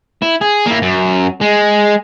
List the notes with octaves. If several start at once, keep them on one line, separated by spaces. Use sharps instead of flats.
E4
G#4
A#3 E4
F#2
G#3